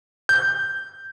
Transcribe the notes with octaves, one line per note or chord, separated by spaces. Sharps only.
G6